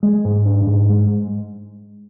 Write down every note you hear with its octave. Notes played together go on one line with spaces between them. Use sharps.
G#3
G#2
D4
G#2
G#3